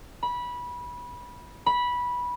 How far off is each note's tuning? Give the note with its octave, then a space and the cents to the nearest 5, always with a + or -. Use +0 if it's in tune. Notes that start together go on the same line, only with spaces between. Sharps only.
B5 -20
B5 -15